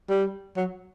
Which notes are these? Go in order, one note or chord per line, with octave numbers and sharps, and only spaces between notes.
G3
F#3